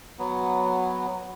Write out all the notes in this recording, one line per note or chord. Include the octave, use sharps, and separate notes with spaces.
F#3 B3